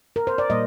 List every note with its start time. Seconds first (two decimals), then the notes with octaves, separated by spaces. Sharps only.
0.16 A#4
0.27 C5
0.38 D5
0.50 A#2 G3 A#3 D#5